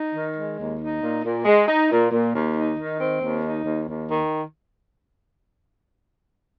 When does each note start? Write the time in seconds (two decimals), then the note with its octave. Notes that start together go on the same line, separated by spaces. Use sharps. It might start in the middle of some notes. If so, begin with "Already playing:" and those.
Already playing: D#4
0.14 D#3
0.36 G#3
0.58 D#2
0.79 D#4
1.02 A#2
1.23 A#2
1.45 G#3
1.68 D#4
1.90 A#2
2.11 A#2
2.34 D#2
2.56 D#4
2.78 D#3
3.00 C4
3.20 D#2
3.42 D#4
3.64 D#2
3.87 D#2
4.09 D#3